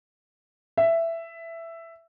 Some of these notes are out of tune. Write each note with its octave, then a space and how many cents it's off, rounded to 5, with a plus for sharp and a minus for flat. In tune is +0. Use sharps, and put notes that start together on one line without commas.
E5 +10